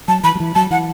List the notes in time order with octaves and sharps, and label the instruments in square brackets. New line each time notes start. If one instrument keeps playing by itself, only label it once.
[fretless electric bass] F#3 [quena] A5
[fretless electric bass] E3 [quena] B5
[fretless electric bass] F#3
E3
[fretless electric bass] F#3 [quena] A5
[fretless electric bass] E3 [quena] F#5